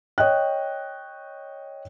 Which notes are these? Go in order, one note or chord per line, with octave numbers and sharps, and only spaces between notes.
C#5 D#5 G5 F#6